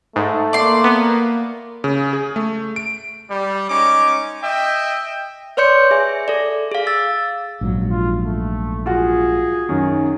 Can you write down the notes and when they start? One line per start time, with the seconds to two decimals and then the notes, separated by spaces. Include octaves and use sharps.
0.16 G#2 A3
0.53 A#3 D5 C6
0.84 B3
1.84 C#3
2.13 G#4
2.36 A3
2.76 D7
3.31 G3
3.70 G#3 C#4 D#4 D6
4.43 D#5 E5 G5
5.57 B4 C#5 D5 C6 G6 C#7
5.91 G#4 E5 G#5
6.28 A4 D5
6.72 G#4 F5
6.87 E6 A6
7.61 A#1 G#2 F#3
7.90 F4
8.22 A3
8.86 F4 F#4 G#4
9.69 F#2 D#3